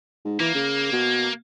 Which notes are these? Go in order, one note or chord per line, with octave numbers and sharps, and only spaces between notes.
G#2
E3 A#3
C#3
B2